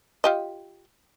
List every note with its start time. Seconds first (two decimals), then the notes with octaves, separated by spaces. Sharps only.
0.24 F4 G4 D#5